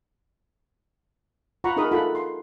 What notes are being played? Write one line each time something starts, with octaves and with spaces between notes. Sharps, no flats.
F4 F#5 A#5 B5 C#6
D#4 G#4 A#4 B5 D#6
D#4 F4 A4 F#5 B5
C6